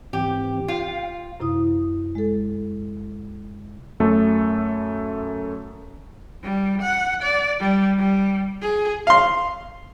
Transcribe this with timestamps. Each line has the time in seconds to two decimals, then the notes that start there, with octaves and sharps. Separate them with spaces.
0.13 G#2 E3 C4 G4
0.68 F4 F5 G5
1.40 F#2 C3 E4 D#6
2.15 G#3 A4
4.00 F#2 A3 A4
6.44 G3
6.82 F#5
7.22 D5
7.60 G3
7.98 G3
8.62 G#4
9.07 F5 C6